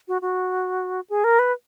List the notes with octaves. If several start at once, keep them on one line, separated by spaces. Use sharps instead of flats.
F#4
F#4
G#4
A#4
B4